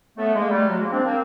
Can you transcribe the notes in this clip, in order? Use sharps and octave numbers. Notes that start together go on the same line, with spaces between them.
A3 B3
G#3 A#3
G3 A3
F#3 G#3
G#3 A#3
C4 D4
A#3 C4